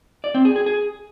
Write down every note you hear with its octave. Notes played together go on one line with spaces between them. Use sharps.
D5
C4
G#4
G#4
G#4